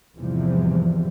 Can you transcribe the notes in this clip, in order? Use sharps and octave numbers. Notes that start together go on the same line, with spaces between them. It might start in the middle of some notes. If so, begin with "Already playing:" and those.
E2 G#2 C3 E3 F3 G3